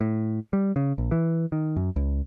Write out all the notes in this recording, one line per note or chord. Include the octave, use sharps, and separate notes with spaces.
A2
G3
C#3
A#1
E3
D#3
F#2
C#2